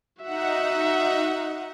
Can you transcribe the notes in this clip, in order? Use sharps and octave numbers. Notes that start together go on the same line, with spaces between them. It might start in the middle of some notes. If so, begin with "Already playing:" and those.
D#4 F#4 E5 F#5